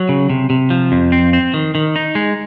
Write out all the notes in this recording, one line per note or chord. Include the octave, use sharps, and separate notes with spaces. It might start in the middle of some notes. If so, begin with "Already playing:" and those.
Already playing: F#3
C#3
C3
C3
F3
F2
C4
C4
D#3
D#3
D#4
G#3